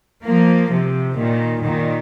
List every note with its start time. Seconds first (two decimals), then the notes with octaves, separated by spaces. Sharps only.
0.24 F3 A#3
0.70 C3 F3
1.16 A#2 D#3
1.63 A#2 D#3